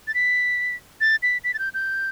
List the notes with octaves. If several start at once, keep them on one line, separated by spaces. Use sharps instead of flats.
A6
B6
A6
B6
B6
A6
G6
G6